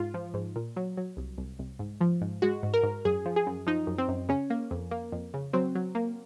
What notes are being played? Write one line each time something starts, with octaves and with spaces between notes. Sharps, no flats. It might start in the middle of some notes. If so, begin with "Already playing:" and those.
Already playing: G#2 F4
F3
G#2
A#2
F#3
F#3
C2
C2
C2
G#2
F3
G#2
G#3 F#4
G#2
A#4
G#2
F#2 G#4
F3
G#4
F#2
F3 D#4
F#2
C4
F#2
C#3 C#4
A#3
F2
A#3
F2
C#3
F#3 C4
F#3
A#3